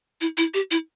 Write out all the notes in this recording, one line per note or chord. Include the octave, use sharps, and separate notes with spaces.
E4
E4
G4
E4